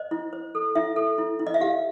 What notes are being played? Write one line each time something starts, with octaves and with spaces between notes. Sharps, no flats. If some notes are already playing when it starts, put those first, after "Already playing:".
Already playing: C5 D#5
E4
C5
A4
E4 E5
A4
E4
E4
D#5
E5
G4 F5